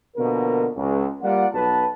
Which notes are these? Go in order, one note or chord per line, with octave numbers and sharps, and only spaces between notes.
B2 D3 F3 A#3 A#4
C#2
G3 A#3 F4 D5 F#5
B1 B2 B3 B4 A5